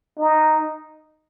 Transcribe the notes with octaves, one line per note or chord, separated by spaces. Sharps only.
D#4